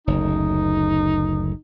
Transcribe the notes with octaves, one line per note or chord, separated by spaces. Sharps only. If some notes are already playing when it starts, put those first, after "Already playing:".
F#1 D2 D#4